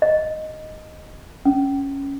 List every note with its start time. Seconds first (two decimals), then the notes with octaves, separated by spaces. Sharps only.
0.02 D#5
1.45 C#4